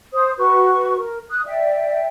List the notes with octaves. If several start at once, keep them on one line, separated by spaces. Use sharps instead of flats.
C5 D#6
F#4 B4 C#6
A#4
D#6 F#6
D5 E5 G5